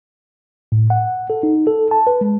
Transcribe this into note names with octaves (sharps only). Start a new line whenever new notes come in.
A2
F#5
A4
D#4
A4
A5
B4
G#3